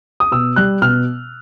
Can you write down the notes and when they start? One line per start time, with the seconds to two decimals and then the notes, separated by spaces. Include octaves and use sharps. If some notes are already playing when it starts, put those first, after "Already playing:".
0.20 D#6
0.32 B2 E6
0.56 G3 F#6
0.82 B2 F6